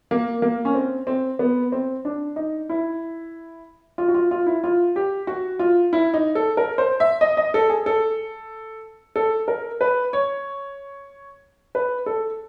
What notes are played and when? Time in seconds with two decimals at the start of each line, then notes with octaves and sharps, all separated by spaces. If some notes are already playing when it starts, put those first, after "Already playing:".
0.11 A#3
0.42 A#3
0.65 C#4
0.75 C4
1.07 C4
1.39 B3
1.72 C4
2.05 D4
2.36 D#4
2.69 E4
3.98 F4
4.08 F#4
4.14 F4
4.31 F4
4.47 E4
4.64 F4
4.96 G4
5.27 F#4
5.59 F4
5.93 E4
6.14 D#4
6.35 A4
6.57 A#4
6.78 C5
7.00 E5
7.21 D#5
7.37 D#5
7.54 A4
7.70 G#4
7.86 A4
9.16 A4
9.48 A#4
9.81 B4
10.13 C#5
11.75 B4
12.06 A4